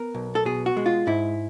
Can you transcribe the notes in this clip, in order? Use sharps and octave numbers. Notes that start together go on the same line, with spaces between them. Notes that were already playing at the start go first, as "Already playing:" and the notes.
Already playing: B3 A#4
B1
A4
B2 G#4
F#4
G#3
F4
G#2 E4